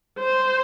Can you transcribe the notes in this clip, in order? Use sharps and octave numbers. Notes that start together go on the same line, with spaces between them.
C5